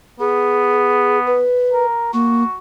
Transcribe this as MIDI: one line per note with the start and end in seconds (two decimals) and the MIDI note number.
0.20 1.42 59
0.20 1.19 68
1.26 1.84 71
1.72 2.11 70
2.13 2.43 58
2.13 2.57 66